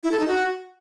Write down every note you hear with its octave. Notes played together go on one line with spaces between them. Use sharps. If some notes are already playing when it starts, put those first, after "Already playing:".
E4
A4
D#4
F#4